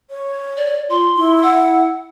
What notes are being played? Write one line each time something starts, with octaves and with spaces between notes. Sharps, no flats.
C#5
D5
F4 C6
E4
F#5